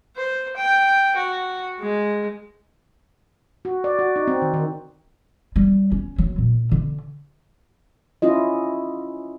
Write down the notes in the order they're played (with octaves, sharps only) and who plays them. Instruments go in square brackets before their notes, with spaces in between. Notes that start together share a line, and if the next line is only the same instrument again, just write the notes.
[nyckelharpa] C5
G5
F#4
G#3
[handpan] F#4
D5
F#4
D#4
C4
D#3
D#3
[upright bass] G3
C#4
F#3
A#2
D3
[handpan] C#4 E4 F4 D#5